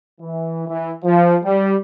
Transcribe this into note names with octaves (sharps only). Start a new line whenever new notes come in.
E3
E3
F3
G3